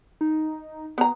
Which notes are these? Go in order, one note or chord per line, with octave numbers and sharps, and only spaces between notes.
D#4
B3 A#5